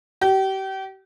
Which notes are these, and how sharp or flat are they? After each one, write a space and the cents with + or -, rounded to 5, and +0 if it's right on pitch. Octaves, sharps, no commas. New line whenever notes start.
G4 -35